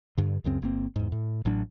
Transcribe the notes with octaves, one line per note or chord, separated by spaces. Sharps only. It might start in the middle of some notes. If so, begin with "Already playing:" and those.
G2 D3
C#2 F#2 C#3 C4
G1 A#3 C4
E2 G#2
A2
A1 A2 F#3 D4